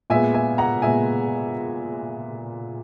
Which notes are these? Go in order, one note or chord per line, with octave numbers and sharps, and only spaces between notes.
A#2 G#3 B3 E5 G#5
E5 G#5
F#5 A#5
A#2 G#3 B3 E5 G#5